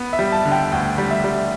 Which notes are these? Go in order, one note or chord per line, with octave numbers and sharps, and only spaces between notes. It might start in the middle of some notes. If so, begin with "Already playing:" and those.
Already playing: B3
E5
G3
A5
D3
G5
D2 G5
G3
E5
G3